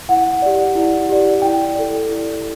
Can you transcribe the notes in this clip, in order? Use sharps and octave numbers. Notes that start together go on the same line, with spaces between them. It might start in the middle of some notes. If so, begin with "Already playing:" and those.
E4 F#5
G4 D5
E4
G4 D5
E4 G5
A4 D5
E4